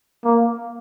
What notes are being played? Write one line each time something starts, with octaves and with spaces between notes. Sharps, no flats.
A#3